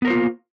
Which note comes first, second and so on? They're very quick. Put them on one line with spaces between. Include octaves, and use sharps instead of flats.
B3 A#4 C5 F4 A#3